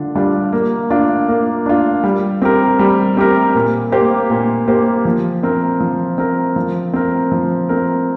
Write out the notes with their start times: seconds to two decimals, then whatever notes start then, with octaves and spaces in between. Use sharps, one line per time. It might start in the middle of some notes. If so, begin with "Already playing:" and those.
Already playing: D3 D4 F4
0.15 G3 D4 F4
0.53 A#3
0.90 D4 F4
1.28 A#3
1.66 D4 F4
2.04 G3
2.42 C4 G4 A#4
2.79 G3
3.17 C4 G4 A#4
3.55 A#2
3.92 A#3 G4 C5
4.30 A#2
4.68 A#3 G4 C5
5.05 F3
5.43 C4 A#4
5.80 F3
6.18 C4 A#4
6.56 F3
6.94 C4 A#4
7.32 F3
7.69 C4 A#4